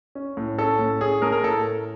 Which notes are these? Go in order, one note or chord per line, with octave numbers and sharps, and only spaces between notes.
C#4
A2
C#4 A4
A2
C#4 G#4
A3 G#4 A#4
A#4
A2 A4